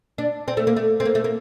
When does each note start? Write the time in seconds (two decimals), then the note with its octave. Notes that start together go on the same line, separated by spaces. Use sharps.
0.18 D4
0.48 C4
0.57 A3
0.67 A#3
0.77 A3
1.00 C4
1.05 A#3
1.15 A3
1.24 A#3